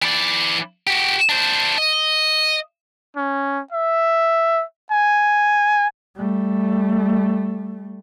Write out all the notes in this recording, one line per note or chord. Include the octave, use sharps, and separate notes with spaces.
E3 D5
F#4 G4
D4 C5
D#5
C#4
E5
G#5
G3 A3